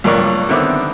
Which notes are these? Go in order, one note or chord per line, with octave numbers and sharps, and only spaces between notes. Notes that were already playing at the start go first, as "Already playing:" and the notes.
C#2 G2 F#3 A#4 D5 C#6
D3 D#3 B3 C4 E5 D6